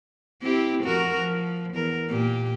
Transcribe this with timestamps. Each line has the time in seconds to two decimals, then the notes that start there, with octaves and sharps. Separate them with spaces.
0.42 C4 E4 G4
0.84 F2 F#4 A#4
1.17 F3
1.74 E2 A#4
2.09 A#2 G4